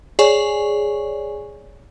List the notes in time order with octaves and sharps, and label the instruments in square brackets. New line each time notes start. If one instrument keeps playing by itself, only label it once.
[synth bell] G#4 C#5 D5 G#5 C#6